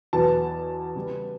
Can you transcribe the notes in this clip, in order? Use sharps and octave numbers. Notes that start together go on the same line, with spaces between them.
E2 B2 F#3 B3 A5
C#3 G3 B3